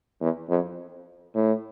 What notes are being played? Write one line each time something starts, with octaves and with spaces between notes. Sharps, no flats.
E2
F2
A2